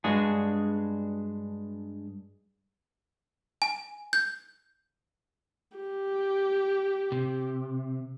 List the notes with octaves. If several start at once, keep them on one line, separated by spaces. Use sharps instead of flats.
G2 G#3 D4 F#4 G#4
G#5
G6
G4
C3